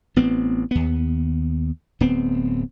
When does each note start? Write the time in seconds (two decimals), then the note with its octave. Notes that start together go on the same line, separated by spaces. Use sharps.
0.16 A1 B3 C4
0.71 D#2 B3
2.00 D1 B3 C4